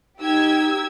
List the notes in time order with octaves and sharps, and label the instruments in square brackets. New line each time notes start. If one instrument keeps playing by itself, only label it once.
[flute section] D#4 [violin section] G4 E6 G#6